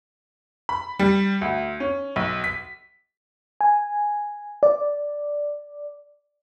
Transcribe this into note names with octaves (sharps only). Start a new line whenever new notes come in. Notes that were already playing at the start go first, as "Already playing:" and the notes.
B5
G3
D2
C#4
B1
B6
G#5
D5